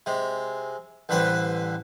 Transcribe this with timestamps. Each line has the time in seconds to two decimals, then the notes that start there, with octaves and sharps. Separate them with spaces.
0.06 C3 G#3
1.09 A1 D3 G3 B4 C5